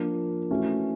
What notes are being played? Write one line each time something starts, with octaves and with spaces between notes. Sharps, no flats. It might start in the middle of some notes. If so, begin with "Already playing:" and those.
Already playing: F3 A#3 D4 F4
E3 A3 C#4 F#4